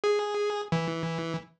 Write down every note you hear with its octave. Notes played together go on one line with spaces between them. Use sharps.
G#4
E3